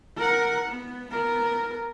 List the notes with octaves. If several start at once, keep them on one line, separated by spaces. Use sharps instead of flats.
A#4 F#5
B3
B3 A#4